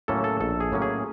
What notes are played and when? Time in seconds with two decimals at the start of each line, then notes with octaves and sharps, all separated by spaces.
0.08 A2 F#3 A#3 C#4 A4
0.24 A4
0.41 A#1 A4
0.60 G#4
0.72 A2 F#3 A#3 C#4
0.82 G#4